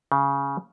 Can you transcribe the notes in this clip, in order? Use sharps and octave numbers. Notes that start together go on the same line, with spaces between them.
C#3